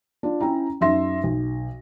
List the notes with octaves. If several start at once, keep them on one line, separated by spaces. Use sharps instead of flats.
D4 F4
C#4 E4 G5 A#5
F#2 D#4 E5 C6 A#6
B1